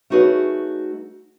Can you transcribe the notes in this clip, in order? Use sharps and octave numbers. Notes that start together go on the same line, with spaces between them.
A3 D#4 F#4 G#4 B4 C#5